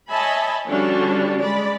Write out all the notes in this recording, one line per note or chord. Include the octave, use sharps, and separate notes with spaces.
C#5 D#5 E5 G#5 A5 B5
D3 F3 G3 C#4 D4 F#4
G#3 D5 B5